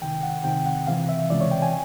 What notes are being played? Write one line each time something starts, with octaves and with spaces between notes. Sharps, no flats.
C#2 C3 D#3 G5
F#5
C#2 C3 D#3 G5
F#5
C#2 C3 E3 F5
E5
C#2 C3 E3 D5
C#5
G5
G#5